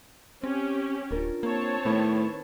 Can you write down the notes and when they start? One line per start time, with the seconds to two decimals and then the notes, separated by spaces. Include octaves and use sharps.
0.44 C4 C#4 G4
1.11 D1 D4 F4 A#4
1.43 A#3 C4 C#5 A5
1.85 A2 D#3 A3 B3 E4